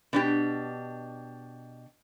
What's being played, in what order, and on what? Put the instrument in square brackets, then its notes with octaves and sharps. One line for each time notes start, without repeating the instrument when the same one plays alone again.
[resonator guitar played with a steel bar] B2 D4 G4